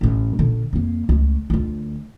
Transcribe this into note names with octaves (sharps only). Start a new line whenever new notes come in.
A1 C#4
A#2 D3
F2 A#3
C#2 A3
D2 F4